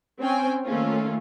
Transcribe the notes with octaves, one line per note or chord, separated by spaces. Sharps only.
C4 C#4 C5 G5 G#5
D#3 A3 A#3 C#4 F4